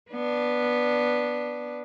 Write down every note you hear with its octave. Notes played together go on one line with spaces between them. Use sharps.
B3 D4